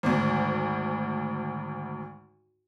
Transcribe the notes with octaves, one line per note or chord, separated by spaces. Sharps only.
G#1 D2